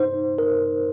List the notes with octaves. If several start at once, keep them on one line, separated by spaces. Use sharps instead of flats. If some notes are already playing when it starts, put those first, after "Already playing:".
Already playing: D#4 C5
A#4